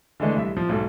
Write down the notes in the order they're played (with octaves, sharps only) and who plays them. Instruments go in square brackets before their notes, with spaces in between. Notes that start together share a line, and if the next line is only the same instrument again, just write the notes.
[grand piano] D3 E3 G#3 A3
C2 E5
F3
B1 G#2 A4